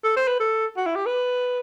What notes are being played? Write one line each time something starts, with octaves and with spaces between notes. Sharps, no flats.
A4
C5
B4
A4
F#4
E4
G4
B4